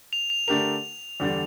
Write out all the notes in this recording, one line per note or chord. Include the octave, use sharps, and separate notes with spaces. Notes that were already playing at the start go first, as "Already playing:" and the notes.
F7
F7
D3 A3 D4 G4 A#4 F7
E2 D3 G3 D4